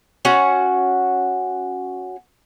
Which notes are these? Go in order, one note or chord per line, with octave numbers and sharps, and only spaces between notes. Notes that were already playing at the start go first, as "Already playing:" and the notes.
C#4 F#4 F#5